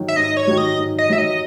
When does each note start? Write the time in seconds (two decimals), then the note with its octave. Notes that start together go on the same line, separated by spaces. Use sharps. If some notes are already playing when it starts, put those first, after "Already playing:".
Already playing: D#3 F#3
0.08 E5
0.16 G#2 D#5
0.37 C#5
0.47 D#3 F#3
0.58 D#5
0.78 G#2
0.98 D#5
1.09 D#3 F#3 E5
1.18 D#5